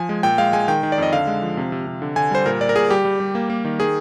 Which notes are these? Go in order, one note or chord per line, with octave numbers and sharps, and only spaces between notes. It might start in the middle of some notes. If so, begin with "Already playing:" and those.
Already playing: F3 G#5
G#3
A#2 G5
G#3 F5
G#3 G#5
D#3 G5
D#3
D5
F2 D#5
D3 F5
G#3
F3
C3
C3
C3
D3
D3 G#5
G3 C5
A#2 A#4
A#2 D5
A#4
A#2 G#4
G3 G4
G3
G3
A#3
A#3
D#3
D#3 G#4